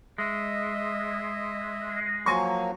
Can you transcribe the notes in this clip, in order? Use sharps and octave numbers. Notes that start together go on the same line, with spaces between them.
G#3 D#5 E5
F3 F#3 A#3 G#5 C6 C#6